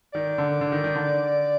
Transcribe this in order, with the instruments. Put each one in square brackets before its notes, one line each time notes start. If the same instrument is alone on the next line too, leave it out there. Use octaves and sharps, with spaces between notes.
[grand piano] D#3 [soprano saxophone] D5
[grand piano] D3
D3
D#3
D#3
D3